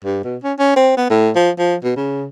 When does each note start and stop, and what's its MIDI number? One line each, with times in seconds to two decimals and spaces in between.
0.04 0.22 43
0.24 0.36 47
0.43 0.53 61
0.59 0.76 61
0.76 0.93 60
0.97 1.09 59
1.10 1.30 45
1.35 1.50 53
1.58 1.75 53
1.83 1.93 47
1.96 2.27 49